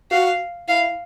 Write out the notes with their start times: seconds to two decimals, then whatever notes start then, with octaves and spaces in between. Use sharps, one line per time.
0.11 F#4 F5
0.68 E4 F5